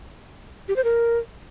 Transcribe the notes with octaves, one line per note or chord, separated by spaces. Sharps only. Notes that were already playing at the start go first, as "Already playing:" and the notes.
G4
C5
A#4